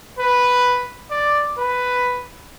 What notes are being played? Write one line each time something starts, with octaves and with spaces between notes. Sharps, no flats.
B4
D5
B4